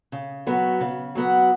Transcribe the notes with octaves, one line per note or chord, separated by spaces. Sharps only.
C#3
F#3 B3 F#4
C#3
F#3 B3 F#4